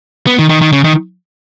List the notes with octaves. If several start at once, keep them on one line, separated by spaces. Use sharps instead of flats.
B3
D#3
D#3
D#3
C#3
D#3